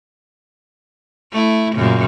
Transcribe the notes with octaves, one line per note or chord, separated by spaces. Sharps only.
A3 E4
F#2 A#2 C#3